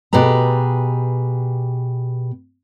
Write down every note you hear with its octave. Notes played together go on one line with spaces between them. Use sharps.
B2 G4 G#4 B4 A#5